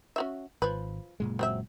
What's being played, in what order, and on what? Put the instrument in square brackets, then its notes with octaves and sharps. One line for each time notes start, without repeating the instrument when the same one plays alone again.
[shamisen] C#4 F#4 E5
[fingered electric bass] G#1 [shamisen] F3 B4
[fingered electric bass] F#1 A#2 G#3
[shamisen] F#3 C4 E5